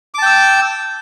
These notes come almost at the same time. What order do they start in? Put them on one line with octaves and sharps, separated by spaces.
D6 A5 G5 E6